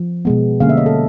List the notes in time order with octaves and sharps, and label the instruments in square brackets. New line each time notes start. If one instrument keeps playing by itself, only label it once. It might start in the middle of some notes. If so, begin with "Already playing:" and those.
Already playing: [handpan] F3
B2 G#3 B3
D3 G3 A#3 C#4 F5
E5
D#5
A4